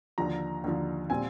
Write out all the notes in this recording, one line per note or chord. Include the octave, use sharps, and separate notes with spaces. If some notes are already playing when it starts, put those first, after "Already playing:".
D#2 D3 F3 A#5
D#2 D3 F3
A#2 G3 C4 G#5